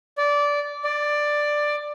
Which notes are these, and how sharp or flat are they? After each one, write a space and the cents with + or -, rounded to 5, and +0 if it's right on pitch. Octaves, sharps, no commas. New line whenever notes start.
D5 -15
D5 +10